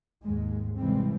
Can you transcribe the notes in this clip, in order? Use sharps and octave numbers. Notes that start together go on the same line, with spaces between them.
D#2 G#2 G#3
C2 C#3 E3 G3 G#3 C4